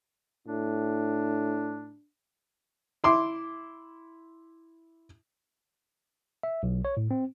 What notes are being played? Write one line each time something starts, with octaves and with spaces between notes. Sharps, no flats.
A2 D4
E4 C6 D6
E5
B1
C#5
A2
C4